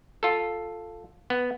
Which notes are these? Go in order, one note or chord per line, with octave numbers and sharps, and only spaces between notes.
F4 A4
B3